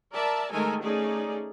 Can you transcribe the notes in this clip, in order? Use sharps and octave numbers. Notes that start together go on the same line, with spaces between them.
A#4 D5 E5 A5
D#3 G#3 A3 A4 A#4 G#5
A3 C#4 D#4 G#4 D5